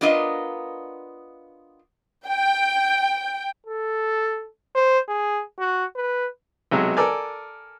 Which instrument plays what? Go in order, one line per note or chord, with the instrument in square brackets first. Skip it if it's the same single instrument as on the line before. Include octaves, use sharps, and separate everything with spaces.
[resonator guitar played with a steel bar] B3 D4 F4 A#4 D#5
[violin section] G5
[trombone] A4
C5
G#4
F#4
B4
[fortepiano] B1 C3 F#3 G#3
A4 A#4 D5 G#5